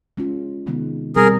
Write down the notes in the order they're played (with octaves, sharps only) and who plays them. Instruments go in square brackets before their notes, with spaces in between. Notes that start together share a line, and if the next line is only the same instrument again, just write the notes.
[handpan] G#3 C#4 F4
C3 D#3 G#3 B3
[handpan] B2 G3 C4 [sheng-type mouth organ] G#4 A#4